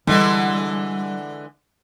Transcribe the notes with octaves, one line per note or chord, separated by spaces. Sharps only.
D3 E3 G3 G#3